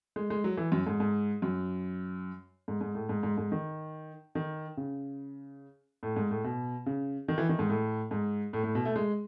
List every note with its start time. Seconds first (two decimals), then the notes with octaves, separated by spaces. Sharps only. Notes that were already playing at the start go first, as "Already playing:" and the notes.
0.16 G#3
0.30 G#3
0.44 F#3
0.57 E3
0.72 F#2
0.87 G#2
1.00 G#2
1.42 F#2
2.68 G#2
2.81 G#2
2.95 A2
3.09 G#2
3.23 G#2
3.37 G#2
3.52 D#3
4.35 D#3
4.77 C#3
6.03 A2
6.16 G#2
6.31 A2
6.44 B2
6.86 C#3
7.28 D#3
7.38 E3
7.49 D#3
7.59 G#2
7.70 A2
8.11 G#2
8.53 A2
8.64 A2
8.75 B2
8.85 A3
8.96 G#3